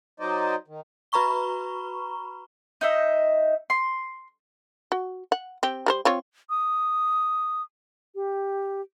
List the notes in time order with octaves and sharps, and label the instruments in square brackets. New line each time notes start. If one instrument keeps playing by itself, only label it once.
[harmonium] F#3 D#4 C5 D5 D#5
D#3
[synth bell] F#4 B4 A#5 B5 C#6 G7
[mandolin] D#4 D#5 E5
C6
[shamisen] F#4
F#5
C4 G4
G3 A#4 C5
C4 F4 C#5
[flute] D#6
G4